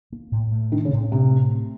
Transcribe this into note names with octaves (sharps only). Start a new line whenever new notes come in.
A#3
A2
A3
D#3 C4
C#3
A2
A2 C3
A3
C4